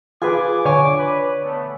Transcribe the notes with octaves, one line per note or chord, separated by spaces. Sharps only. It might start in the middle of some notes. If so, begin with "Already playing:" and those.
F4 G#4 B4 G#5 D6
D3 C#5 G#5 C#6
B4
A3 B3